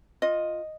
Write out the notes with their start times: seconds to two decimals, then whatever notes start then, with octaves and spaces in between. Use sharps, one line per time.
0.22 F4 D#5